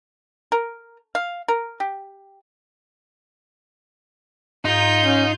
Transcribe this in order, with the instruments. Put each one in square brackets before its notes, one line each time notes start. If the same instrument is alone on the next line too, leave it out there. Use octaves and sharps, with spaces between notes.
[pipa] A#4
F5
A#4
G4
[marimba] G#2 [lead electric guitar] D#4 [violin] F4 G6
[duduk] C#4